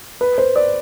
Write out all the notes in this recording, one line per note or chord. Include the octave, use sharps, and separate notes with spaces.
B4
C5
D5